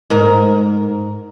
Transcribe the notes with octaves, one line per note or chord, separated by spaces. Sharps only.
G#2 A#4